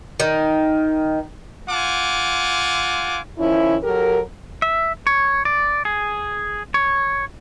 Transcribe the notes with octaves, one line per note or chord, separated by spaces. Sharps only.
D#3
F4 F#5 G#5 D6
D#3 F3 C#4 E4
F#3 G4 A4 A#4
E5
C#5
D5
G#4
C#5